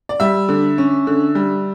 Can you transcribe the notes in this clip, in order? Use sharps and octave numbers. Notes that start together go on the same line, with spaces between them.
D5
G3 E5
D3
C#4
D3
G3